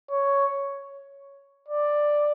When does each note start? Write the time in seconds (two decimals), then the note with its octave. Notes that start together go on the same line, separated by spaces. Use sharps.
0.11 C#5
1.68 D5